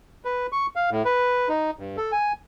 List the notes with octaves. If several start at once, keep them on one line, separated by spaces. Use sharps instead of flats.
B4
C#6
F5
A2
B4
D#4
G2
A4
G#5